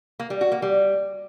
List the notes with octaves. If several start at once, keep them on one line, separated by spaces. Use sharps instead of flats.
A#3
G3
F#4
A#3
G3